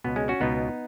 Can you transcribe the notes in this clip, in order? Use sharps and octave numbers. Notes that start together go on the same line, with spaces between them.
C#2 B2 B3
G#3 C#4
C#4 F#4
C#2 B2 B3 D#4